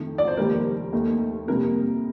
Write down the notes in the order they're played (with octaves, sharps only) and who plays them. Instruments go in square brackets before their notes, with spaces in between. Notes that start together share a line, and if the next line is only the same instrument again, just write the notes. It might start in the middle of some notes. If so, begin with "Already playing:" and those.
Already playing: [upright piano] F2 D#3 A3
D5
C5
F1 D#2 D#3 G3 A#4
D#2 D#3 A3 D#4
F2 C3 G3 A#3 A#4